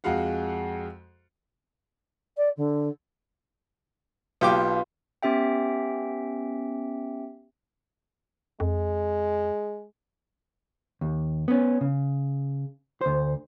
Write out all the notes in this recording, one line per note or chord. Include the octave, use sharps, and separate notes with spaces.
F2 G#3 F#4 F5 F#5
D5
D3
B1 B2 F4 G4 D6
B3 C#4 G4 E5 G5
F2 G#3
D#2
B3 C#4
C#3
D2 C5